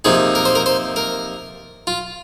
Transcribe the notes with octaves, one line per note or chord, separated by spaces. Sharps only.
C3 F3 A#3 D#4 G#4
A#4
C5
A#4
C5
A#4
F4